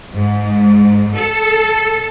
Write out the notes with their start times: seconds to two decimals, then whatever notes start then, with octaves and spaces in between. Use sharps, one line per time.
0.15 G#2
1.16 A4